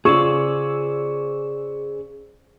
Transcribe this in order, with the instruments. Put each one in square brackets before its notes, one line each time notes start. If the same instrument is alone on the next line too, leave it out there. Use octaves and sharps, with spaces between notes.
[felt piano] C#3 [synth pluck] F4 E6 [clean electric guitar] G#4 C5 D5 [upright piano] C#6